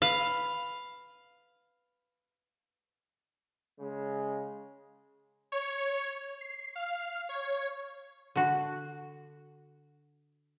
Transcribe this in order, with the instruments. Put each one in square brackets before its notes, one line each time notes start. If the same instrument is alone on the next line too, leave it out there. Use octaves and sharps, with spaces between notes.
[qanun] B4 [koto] F5
[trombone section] C#3 G#3
[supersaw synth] C#5
C7
F5
C#5
[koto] D3 F#4